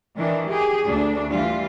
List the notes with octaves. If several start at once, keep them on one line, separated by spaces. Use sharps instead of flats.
D#3 E3 D4
G4 G#4
D2 D4
E3 G3 F4